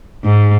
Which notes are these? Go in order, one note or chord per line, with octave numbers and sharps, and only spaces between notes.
G#2